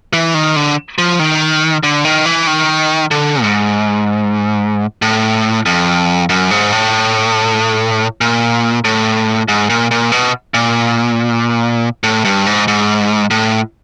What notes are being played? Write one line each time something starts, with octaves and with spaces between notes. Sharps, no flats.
E3
D#3
D3
F3
D#3
D3
D#3
E3
D#3
D3
G#2
A2
F2
F#2
G#2
A2
A#2
A2
G#2
A#2
A#2
B2
A#2
A2
G2
G#2
G#2
A2